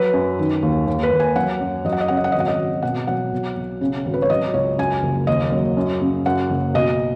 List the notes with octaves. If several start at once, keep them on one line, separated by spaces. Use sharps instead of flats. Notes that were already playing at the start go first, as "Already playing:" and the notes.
Already playing: F#3 B4
F#2
D#3
D#2
D#2
B4
D#2
G#5
F#3 F#5
F#2
F#3 D#5
F#5
D#5
C#3 F#5
D#5
F#5
G#1 D#5
F#5
D#5
G#1
B2 F#5
F#3 F#5
B1
B1
C#3
G#1
B4
C#5
F#3 D#5
C#2 C#5
F#2 G#5
F#1
D#2 D#5
F#3
F#2
C#3
F#2 F#5
F#1
B1 D#5